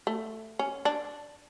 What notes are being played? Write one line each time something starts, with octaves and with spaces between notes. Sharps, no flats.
A3
C#4
D4